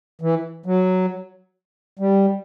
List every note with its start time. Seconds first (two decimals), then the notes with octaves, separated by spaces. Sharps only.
0.21 E3
0.66 F#3
1.99 G3